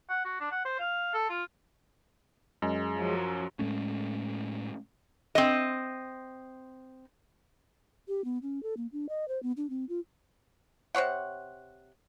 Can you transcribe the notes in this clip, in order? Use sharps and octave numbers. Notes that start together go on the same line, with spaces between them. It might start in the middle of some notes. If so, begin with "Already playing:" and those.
F#5
F#4
D4
F#5
C5
F5
A4
F4
F#2 G#3
F3 F#3
A2 G#3 A3 C#4
C4 D#5
G4
B3
C#4
A4
A#3
D4
D#5
C5
B3
D4
C4
F4
C3 C5 C#5 F#5